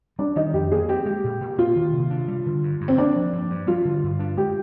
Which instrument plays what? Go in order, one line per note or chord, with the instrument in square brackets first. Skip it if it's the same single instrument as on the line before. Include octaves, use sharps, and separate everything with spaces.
[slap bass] G3 [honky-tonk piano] D4
[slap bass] D#3 [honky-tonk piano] D#4
[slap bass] F2 [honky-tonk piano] G4
[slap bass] A#3 [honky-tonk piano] G#4
[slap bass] C4 [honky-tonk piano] G4
[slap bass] G#3
A#2
A#2
[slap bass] A#3 [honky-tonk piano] F4
[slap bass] D#3
C3
D4
G3
D3
G2
G2
[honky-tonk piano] C4
[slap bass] A#3 [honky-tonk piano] D4
[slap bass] F3
G2
G2
[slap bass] G3 [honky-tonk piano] F4
[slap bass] D3
G2
D4
[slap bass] G#3 [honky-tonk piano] G4